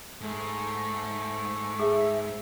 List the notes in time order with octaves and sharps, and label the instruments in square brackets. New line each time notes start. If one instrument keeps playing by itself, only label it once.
[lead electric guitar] G#2 [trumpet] A3
[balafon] G#4 [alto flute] E5